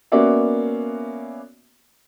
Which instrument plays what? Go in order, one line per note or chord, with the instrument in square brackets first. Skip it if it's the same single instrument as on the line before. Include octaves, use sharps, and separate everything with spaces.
[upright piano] A#3 B3 C#4 F#4 D5 E5